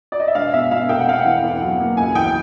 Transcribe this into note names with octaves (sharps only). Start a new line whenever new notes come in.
D5
D#5
E5
E1 F5
B2 E5
E1 F5
F1 G5
F#5
C3 F5
F#5
E3
E2
F#3
A#3
C#2 G#5
E3 G5